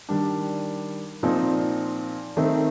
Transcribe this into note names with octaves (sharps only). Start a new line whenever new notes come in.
D#3 G3 D4
A#2 F3 C4 D#4
D#3 A3 C4 D#4